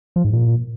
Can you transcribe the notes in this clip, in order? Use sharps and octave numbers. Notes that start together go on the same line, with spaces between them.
F3
G#2
A#2